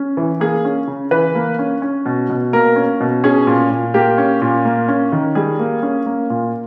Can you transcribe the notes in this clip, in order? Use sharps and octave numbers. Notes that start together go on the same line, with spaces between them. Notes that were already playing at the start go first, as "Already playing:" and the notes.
Already playing: C#4
E3
A#3 G#4
C#4
C#3
E3 B4
A#3
C#4
C#4
B2
B2
A#3 A#4
C#4
B2
C#4 G#4
A#2
A#2
A#3 G4
C#4
A#2
A#3
C#4
D#3
G3 G#4
A#3
C#4
A#3
A#2